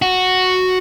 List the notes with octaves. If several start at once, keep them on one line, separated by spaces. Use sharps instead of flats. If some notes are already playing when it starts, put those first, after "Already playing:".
F#4